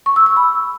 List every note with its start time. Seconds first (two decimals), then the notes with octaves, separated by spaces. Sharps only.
0.06 C#6
0.16 E6
0.26 E6
0.37 B5